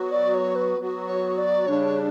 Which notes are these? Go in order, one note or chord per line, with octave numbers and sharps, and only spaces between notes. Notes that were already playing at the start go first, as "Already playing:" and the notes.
Already playing: F#3 B3 F#4
D5
C#5
B4
F#3 B3 F#4
C#5
D5
C#3 G3 D4 C#5